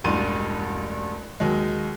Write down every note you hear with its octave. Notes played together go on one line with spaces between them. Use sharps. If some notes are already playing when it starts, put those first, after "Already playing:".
E1 A1 G2 C6 D#7
D#2 F#3 G#3